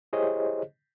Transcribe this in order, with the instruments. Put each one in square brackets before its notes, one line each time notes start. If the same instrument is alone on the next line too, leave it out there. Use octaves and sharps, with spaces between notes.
[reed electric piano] E4 G4 G#4 C5 C#5 D#5